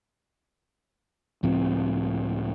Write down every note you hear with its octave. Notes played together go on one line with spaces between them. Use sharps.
C#2 A2 F3 C4